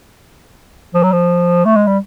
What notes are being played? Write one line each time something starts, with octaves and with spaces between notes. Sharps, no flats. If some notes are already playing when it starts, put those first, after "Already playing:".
F3
F#3
F3
A3
G#3
G3